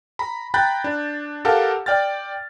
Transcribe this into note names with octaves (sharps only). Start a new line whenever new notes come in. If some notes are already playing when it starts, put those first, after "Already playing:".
A#5 B5
G5 A#5 B5 F#6 G6 A6
D4
G4 A4 A#4 F5 F#5 A5
D5 G5 F6 A6